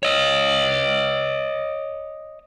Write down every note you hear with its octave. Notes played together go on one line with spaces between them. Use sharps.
C#5 D#5